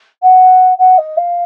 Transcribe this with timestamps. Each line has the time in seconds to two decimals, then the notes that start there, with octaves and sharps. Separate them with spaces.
0.22 F#5
0.78 F#5
0.98 D#5
1.17 F5